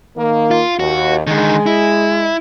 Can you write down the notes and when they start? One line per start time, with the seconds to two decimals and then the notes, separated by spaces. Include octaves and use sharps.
0.17 D#3 A#3
0.51 F4
0.80 D#2 F#4
1.27 D3 D#3 G#3
1.66 E4